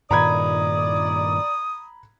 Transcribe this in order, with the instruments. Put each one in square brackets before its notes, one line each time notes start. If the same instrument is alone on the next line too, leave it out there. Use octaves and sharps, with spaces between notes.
[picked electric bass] G2 A#2 D#3 [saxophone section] D5 [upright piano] A#5 B5 G#6 [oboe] D#6